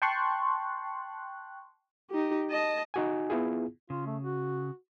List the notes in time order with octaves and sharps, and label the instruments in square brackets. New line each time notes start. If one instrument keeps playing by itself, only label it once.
[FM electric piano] G5 A5 C6 C#6 F#6
[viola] D#4 G4
D#5 A5
[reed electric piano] D#4 F#4 G#5
B3 E4 F4 G#4
[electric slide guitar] C#3 [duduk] F4
[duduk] A3
F#4